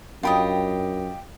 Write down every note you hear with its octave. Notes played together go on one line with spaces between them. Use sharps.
F#2 D4 F4 G4 D#5 G5 B5